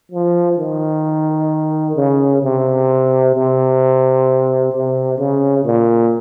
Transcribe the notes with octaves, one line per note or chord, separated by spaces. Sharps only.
F3
D#3
C#3
C3
C3
C3
C#3
A#2